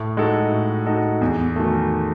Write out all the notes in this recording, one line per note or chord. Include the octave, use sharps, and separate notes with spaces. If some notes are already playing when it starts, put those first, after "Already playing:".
Already playing: A2
G#3 D#4 F#4 A4
A2
G#3 D#4 F#4 A4
E2
D#3 F#3 A3